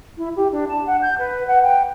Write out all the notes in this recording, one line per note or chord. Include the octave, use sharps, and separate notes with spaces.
E4
G4
D4
A5
F#5
G6
B4
F#5
G5